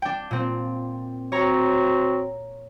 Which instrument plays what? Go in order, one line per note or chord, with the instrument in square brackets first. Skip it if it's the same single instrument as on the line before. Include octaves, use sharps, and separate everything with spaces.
[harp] D4 G5
A#2 C4
[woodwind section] C4 F#4 [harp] C#5 A#5